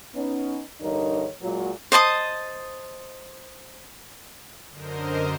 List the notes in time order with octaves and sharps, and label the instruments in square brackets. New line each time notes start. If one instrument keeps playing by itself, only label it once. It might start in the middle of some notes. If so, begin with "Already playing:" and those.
[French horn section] B3 C#4 D#4
E2 G2 D3 D#4 A#4 C#5
A#2 F#3 G#3
[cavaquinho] C5 D#5 A5 D#6
[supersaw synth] F#2 D3 A#4 C5 D#5